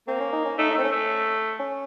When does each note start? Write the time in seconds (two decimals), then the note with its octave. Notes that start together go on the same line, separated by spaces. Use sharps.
0.07 A#3 C4
0.20 C#4
0.33 D#4
0.45 C#4
0.58 A3 D#4
0.70 D#4
0.75 A3 C4
0.84 C#4
0.92 A3
1.60 C#4